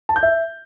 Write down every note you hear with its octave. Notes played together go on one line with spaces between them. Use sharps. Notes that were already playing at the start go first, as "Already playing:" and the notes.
A5
G6
E5